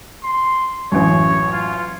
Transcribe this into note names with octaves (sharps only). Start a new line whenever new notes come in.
C6
A1 F#2 C#5
F4